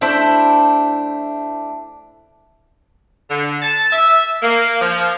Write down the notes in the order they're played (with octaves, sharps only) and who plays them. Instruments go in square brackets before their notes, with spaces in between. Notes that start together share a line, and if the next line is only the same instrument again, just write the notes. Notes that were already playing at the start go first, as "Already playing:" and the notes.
[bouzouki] A3 D4 E4 C5
[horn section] D3
A5
E5
A#3
F3